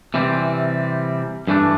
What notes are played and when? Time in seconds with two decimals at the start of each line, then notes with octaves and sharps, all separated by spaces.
0.14 C3 E3 G3 C4
1.47 G2 E3 A3 D4